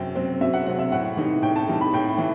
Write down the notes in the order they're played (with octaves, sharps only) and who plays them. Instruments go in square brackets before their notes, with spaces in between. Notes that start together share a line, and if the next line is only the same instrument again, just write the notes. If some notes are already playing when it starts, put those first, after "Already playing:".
Already playing: [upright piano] F#2 F#3 C4 G5
F#3 C4
F#2 E5
F#5
F#3 C4 F#5
E5
A2 F#5
E3 G3 D#4
A2 G5
A5
E3 G3 D#4
B5
A2 G5
E3